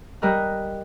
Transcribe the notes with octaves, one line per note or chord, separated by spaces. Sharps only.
G3 A#4 D#5 F#6